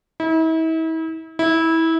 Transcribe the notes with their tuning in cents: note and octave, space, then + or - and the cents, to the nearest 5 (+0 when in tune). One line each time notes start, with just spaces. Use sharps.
E4 -40
E4 -20